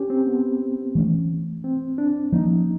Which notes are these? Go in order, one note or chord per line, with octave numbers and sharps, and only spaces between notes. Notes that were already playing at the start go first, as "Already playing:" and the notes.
Already playing: C#4 G4
C4
B3
E3 A3 C#4
C4
D4
F3 A#3 C#4 D#4